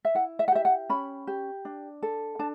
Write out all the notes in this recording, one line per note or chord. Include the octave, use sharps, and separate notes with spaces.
E5
E4 F#5
E5
F#5
G4 E5
F#5
C#4 B5
G4
D4
A4
D4 A5